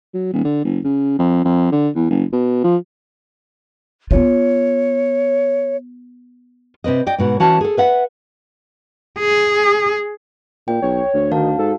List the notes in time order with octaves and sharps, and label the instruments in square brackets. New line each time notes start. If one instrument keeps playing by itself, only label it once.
[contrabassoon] F#3
D#1
D3
F#1
C#3
F2
F2
D3
E2
F#1
B2
F3
[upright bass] B3 F4 [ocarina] C#5
[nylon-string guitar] C3 C4 B4 D#5
D5 D#5 G5
G#2 B2 F#4
E3 C#4 F#4 A5
G#4 A4
B4 E5 F#5
[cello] G#4
[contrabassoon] A#2 [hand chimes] G5
[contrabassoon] B1 [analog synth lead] C#5
[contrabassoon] D2
[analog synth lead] D#3 [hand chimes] F#4 F5 A5
[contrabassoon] G#2 [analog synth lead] A4